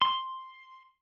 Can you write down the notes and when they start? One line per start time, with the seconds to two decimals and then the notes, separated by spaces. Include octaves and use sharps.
0.02 C6